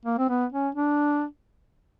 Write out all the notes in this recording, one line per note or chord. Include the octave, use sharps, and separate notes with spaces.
A#3
C4
B3
C#4
D4